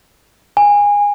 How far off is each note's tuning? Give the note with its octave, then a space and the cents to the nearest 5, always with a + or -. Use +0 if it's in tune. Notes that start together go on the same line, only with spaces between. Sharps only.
G#5 -20